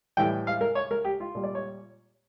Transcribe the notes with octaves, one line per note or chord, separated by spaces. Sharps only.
A2 E3 G3 G5
F5
A#4
C#5
A#4
G4
F4
A#2 G3
D5
C#5